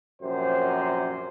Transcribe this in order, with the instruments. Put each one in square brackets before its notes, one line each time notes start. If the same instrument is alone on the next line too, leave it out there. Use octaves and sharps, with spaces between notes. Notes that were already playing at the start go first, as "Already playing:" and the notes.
[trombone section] A#1 F#2 C3 C5